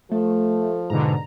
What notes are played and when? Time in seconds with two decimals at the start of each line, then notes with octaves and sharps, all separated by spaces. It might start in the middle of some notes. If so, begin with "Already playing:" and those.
0.11 F3 A3 A4
0.90 G#2 B2 D3 A#5